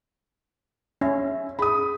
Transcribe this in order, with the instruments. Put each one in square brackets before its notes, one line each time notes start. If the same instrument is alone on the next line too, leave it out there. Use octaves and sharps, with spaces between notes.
[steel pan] C#4 [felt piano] E5
[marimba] G#4 [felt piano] B5 D#6